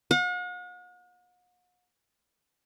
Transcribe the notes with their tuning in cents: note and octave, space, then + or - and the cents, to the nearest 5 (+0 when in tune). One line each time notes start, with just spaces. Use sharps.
F#5 -45